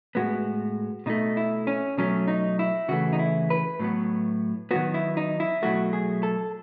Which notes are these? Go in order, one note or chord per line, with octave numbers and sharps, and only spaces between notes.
A2 G#3 B3 F#4
B2 A3 D#4
E4
C#4
B2 F#3 A3 C#4
D#4
E4
C#3 E3 A3 F#4
D#4
E4
B4
A2 F#3 B3
D#3 F#3 B3 F#4
E4
D#4
E4
B2 F#3 A3 F#4
G#4
A4